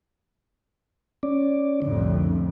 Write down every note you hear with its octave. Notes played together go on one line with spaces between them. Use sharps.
C#4 D5
C2 F2 A2 D3